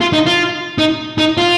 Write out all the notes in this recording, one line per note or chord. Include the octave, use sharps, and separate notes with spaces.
F4
D#4
F4
D#4
D#4
F4